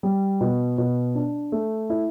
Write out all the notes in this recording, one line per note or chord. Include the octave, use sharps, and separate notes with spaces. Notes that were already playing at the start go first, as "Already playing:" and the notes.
G3
B2
B2
D4
A3
E4